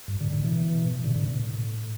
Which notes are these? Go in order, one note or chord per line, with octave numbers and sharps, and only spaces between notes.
G2
A2 D3
A2 D3
B2 E3
A2 D3
A2 D3
B2
A2